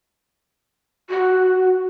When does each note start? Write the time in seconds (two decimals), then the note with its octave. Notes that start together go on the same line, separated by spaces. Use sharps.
1.10 F#4